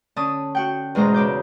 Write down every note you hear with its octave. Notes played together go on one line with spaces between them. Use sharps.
D3 C#4 A5 D#6
F#4 F#5 G5
E2 G#2 B2 G#3 C5 A#5
C#3 D6 G6